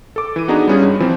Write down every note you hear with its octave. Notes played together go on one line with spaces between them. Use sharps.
A4 D6
E3 D#7
B3 D4 D#4 F#4 G#4 A#5
G3 B3 C#4 F4 G#4
G2
E3 F3 C4